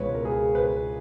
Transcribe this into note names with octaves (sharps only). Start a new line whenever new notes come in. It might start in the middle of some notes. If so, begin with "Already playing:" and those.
Already playing: C#2 B2 B4 C#5
A#4
G#4
B4